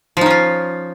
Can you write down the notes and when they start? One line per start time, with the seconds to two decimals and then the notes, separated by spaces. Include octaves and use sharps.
0.17 F3
0.21 D#4
0.26 C#4
0.30 F4